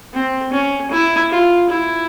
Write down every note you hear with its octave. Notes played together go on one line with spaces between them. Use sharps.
C4
C#4
E4
F4
E4